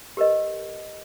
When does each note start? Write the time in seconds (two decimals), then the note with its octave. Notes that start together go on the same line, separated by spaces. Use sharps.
0.17 G4 A#4 B4 D#5